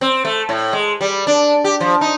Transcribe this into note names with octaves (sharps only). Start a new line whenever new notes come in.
C4
A3
A2
G#3
G3
D4
G4
F3
D#4